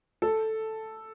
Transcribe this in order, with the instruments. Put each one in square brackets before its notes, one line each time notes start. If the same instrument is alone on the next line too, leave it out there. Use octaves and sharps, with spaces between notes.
[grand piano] A4